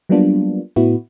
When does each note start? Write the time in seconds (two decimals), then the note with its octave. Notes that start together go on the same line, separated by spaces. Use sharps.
0.09 F#3 G3 A#3 B3 D4 F4
0.76 A2 B3 E4 F#4